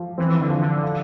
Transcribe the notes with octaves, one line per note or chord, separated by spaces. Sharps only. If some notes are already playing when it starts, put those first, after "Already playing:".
Already playing: F3
E3 C4
D3
F3
D3
F4